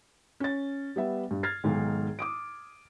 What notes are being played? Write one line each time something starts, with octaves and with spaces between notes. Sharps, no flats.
C#4 A6
G3 B3 E5
G2
F6 G#6 A6 C7
B1 G#2 D#3
D6 D#6 D7